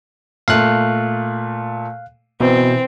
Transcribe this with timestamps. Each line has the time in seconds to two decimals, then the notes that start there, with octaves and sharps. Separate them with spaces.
0.48 A#2 A3 F5 F#6
2.40 B2 E3 C4